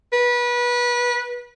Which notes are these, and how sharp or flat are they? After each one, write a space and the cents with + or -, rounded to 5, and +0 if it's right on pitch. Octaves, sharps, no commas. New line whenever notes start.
B4 -25